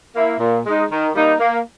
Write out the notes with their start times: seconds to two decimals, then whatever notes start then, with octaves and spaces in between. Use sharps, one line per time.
0.16 A#3 E4
0.40 A#2
0.65 G#3 D#4
0.90 D#3
1.15 G3 A#3 D#4
1.40 A#3